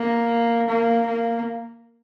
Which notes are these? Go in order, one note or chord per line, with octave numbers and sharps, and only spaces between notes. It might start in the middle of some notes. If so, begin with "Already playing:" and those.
Already playing: A#3
A#3
A#3